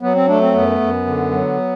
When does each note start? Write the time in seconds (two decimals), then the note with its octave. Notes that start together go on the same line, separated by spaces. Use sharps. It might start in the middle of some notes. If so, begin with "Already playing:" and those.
0.01 F#3 B3
0.15 C4
0.27 A3 D4
0.41 C4
0.53 F#2 B3
0.80 F#2
1.06 D3
1.32 F#3